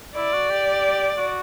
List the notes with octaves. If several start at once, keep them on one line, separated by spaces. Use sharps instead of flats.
E4 D5
F#4
G4
F#4